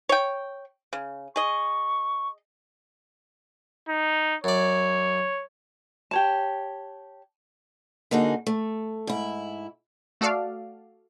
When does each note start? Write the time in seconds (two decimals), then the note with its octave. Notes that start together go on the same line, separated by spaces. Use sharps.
0.09 C#5 G5
0.93 C#3
1.36 G#4 D#5 C#6
3.89 D#4
4.44 F#2 C#5 D5
6.11 G4 C#5 A5
8.11 D3 A#3 D#4 F#4 G#4
8.46 A3
9.07 G#2 E4
10.21 A3 F#4 A4 D5 F5